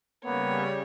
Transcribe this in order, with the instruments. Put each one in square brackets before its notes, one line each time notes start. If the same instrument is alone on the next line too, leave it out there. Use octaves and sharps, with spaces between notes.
[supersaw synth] C#3 G3 [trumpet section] A#3 B3 [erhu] C#5